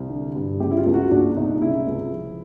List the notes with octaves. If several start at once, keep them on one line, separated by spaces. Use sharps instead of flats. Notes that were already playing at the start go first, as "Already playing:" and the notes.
Already playing: C2
D3
G2
C#3 G4
E4
F4
C#2
F#4
A#2 D4
C2 D#4
C#3 E4
C#2
F3